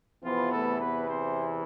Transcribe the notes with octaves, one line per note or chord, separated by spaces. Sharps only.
E2 C3 E3 F3 B3 F4
A3 A4
B3 B4
C4 C5